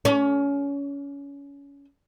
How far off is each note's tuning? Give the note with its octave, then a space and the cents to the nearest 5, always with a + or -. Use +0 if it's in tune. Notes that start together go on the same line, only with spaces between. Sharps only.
C#4 +25